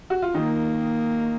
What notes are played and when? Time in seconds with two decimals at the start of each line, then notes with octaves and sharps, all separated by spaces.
0.10 F#4
0.22 F4
0.34 D#3 A#3 D#4